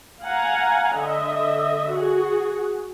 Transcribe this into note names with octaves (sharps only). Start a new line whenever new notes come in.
F5 F#5 G#5 A#5
D3 D#5 E5
F#4 G#4